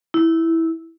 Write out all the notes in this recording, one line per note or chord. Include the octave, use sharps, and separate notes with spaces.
E4